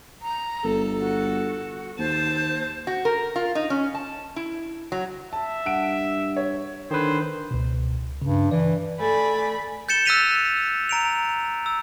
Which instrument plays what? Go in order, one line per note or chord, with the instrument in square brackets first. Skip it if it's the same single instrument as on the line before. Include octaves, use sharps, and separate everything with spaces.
[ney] A#5
[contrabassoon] G1 [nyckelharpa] A4
[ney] F#4
[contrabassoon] D#2 [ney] C5 [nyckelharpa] A5
[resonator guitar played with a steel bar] F#4
A#4
F4
D#4
C#4
A5
E4
F#3
[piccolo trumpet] E5 [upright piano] A5
[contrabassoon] G2 [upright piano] F#5 D7
[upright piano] C#5
[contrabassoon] D3 [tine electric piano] D#3 B4 [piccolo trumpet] C5
[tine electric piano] C#2 B2
[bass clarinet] G2 [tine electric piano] C#3
[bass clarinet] E3 [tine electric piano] D5
[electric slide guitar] A3 A4 [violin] D5 G#5 [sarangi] B5
[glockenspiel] G6 A6 C#7 E7 G7
E6 F#6 A6 B6 D#7 F7
A#5 D7 F7
E6